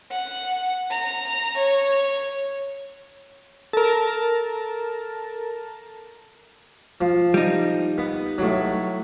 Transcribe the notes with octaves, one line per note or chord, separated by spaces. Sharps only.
F#5
A#5
C#5
A4 A#4 A5
F3
G3 D#4
B3
A2 F#3